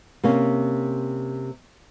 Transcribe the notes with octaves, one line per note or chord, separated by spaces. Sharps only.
C3 A#3 C#4